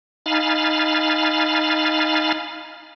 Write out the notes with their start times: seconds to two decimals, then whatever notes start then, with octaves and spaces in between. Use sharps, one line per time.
0.26 D#4 F5 G#5 B5 F6 A6